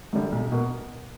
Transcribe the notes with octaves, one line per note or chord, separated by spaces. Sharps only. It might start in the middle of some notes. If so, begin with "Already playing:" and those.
F#2 D3 G3
B1
B2 A#3